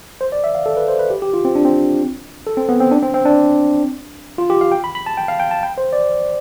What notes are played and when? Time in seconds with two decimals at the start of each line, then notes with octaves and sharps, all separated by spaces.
0.21 C5
0.32 D5
0.44 E5
0.55 F5
0.66 A4
0.77 B4
0.88 C5
0.99 B4
1.10 G4
1.22 G4
1.34 F4
1.45 C4
1.55 D4
1.65 C4
2.47 A4
2.57 C4
2.69 B3
2.80 C4
2.91 D4
3.02 C4
3.14 C4
3.25 D4
4.38 F4
4.50 G4
4.61 F5
4.72 G5
4.84 B5
4.95 B5
5.06 A5
5.17 G5
5.28 F5
5.40 G5
5.51 A5
5.63 G5
5.78 C5
5.93 D5